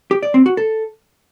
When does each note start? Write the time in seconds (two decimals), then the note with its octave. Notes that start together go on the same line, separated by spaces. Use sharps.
0.11 G4
0.23 D5
0.34 C4
0.46 F#4
0.57 A4